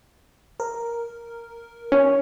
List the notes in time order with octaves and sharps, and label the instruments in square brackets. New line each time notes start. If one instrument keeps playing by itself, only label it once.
[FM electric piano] A#4
[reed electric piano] C#4